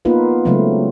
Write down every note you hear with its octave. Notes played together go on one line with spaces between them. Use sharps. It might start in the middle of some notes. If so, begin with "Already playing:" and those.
A#3 B3 D#4 F4 B4
C#3 F#3 G#3 A3 C4